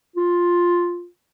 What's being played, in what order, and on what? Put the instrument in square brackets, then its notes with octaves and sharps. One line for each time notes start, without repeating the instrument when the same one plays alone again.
[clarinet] F4